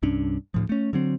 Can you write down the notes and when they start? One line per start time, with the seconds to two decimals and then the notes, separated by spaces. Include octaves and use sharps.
0.03 C2 G2 C#4 D4
0.54 D2 A2 F3
0.69 A3 C#4
0.93 D3 F#3 C4